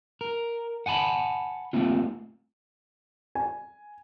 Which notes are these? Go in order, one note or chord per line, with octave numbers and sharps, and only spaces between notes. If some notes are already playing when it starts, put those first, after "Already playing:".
A#4
F#5 G#5 A5 B5
A3 A#3 C4 F4
G#5